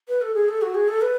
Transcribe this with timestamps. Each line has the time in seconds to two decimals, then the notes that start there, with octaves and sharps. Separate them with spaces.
0.08 B4
0.22 A4
0.35 G#4
0.48 A4
0.62 F#4
0.75 G#4
0.88 A4
1.02 B4